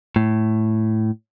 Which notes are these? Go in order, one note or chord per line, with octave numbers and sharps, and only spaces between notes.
A2